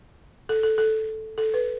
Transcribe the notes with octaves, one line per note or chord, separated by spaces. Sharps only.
A4
A4
A4
A4
B4